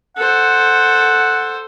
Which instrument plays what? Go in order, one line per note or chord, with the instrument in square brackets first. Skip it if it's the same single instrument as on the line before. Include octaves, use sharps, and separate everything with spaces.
[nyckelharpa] A4 C5 [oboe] F#5